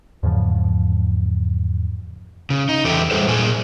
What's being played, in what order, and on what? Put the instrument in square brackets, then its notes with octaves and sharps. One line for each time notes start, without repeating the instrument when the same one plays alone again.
[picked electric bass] E2 G#2 C#3 F3
[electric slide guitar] C#3
D#4
E2 G4 A4 E5 G5
G3 A3 A#3 G#4 A4 C5
A#2 G#4 G#5